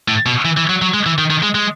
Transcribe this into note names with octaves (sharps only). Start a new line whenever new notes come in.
A2
B2
E3
E3
F#3
F#3
G#3
E3
D#3
D#3
G#3
G#3